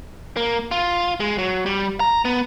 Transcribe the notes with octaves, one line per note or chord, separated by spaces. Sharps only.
A#3
F4
G#3
F#3
G3
A#5
B3